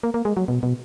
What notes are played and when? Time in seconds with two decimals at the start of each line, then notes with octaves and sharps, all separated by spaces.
0.03 A#3
0.14 A#3
0.25 G#3
0.37 F#3
0.48 B2
0.63 B2